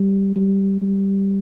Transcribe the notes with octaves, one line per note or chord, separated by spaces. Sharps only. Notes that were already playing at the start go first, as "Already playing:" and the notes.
Already playing: G3
G3
G3